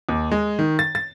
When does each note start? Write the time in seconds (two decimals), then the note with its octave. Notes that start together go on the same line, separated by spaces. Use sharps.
0.09 D#2
0.31 G#3
0.59 D#3
0.79 A6
0.95 A6